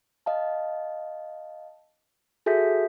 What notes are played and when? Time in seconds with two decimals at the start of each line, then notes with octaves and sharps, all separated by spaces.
0.26 D#5 F5 A5
2.46 F#4 G#4 A4 E5 G6 B6